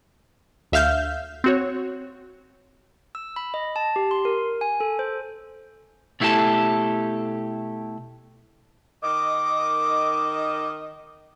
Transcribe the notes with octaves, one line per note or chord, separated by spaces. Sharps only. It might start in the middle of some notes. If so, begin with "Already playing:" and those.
D2 E5 F5 F6 G6
C4 F#4 C#5
E6
B5
D#5
A5
G4
C6
A#4
G#5
A4
C5
B2 A3 E4 F4 G4 A4
D#3 D#5 D6